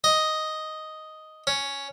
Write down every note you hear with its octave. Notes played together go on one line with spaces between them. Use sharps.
D#5
C#4